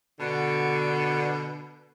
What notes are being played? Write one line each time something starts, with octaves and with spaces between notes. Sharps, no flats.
B2 D3